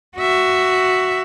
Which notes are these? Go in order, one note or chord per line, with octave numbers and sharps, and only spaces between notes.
F#4 E5